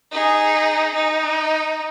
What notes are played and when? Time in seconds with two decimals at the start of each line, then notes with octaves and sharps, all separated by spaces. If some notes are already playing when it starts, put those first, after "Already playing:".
0.11 D#4 G#4
0.95 D#4